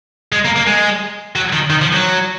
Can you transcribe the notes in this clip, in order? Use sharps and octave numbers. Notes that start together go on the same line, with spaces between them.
G#3
A#3
A#3
G#3
F#3
D#3
D#3
F3
F#3